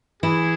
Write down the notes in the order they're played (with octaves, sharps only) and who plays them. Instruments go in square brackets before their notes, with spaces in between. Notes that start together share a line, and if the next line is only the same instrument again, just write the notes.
[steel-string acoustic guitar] E3 E4 [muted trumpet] G#4